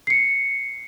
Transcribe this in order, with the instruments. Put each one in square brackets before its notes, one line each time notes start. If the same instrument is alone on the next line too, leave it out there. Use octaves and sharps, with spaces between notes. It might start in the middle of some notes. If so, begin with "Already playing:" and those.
[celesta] C7 C#7